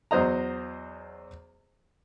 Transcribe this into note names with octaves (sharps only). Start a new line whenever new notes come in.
E2 F#3 C5 D#5 A#5